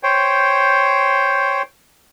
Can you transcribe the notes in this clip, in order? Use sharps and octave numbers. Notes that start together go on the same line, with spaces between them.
C5 C#5 G5